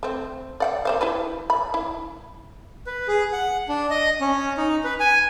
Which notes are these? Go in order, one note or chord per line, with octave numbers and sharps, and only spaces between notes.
A3 C4
D5 F#5 G5
A#3 C5 F5
E4 G4 B4
B5
E4
B4
G#4
F#5
D4
D#5
C#4
D#4
B4
G#5